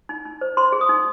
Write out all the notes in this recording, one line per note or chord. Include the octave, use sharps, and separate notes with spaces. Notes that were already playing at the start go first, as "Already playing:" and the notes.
D#4
D#4
C5
C5 C6
G#4
D#6
D#4